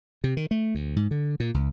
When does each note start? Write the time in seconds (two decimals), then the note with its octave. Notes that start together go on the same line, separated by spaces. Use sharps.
0.24 C3
0.37 D#3
0.51 A3
0.75 D2
0.96 G#2
1.11 D3
1.40 A#2
1.54 C#2